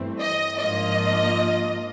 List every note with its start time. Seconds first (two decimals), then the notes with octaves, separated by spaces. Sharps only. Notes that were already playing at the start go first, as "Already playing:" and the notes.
Already playing: G2 E3 A3 C4
0.19 D#5
0.57 G#2 F3 A#3 D4 F4 D#5